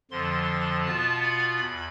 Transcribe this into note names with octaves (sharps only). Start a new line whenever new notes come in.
F2 D3 F3 C6
B2 B3 F4 A5
B5
E2